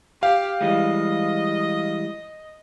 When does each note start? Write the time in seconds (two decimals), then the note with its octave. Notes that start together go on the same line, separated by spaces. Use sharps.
0.23 G4 F5
0.61 E3 G3 G#3 D#5